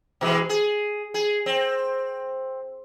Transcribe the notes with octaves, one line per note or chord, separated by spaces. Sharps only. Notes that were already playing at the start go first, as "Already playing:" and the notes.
B2 E3 G#3
G#4
G#4
C4